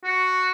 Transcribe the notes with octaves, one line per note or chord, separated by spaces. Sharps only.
F#4